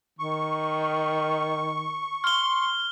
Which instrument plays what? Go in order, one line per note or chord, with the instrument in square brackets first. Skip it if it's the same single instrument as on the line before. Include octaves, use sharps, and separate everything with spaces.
[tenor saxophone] D#3 [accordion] C#6
[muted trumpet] C6 [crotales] F6 G7